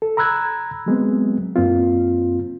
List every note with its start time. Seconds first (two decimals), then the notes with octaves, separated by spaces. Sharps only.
0.02 A4
0.17 A#5 B5 E6 F#6 G#6
0.86 F#3 G#3 B3 C4
1.56 F#2 A#3 C4 F4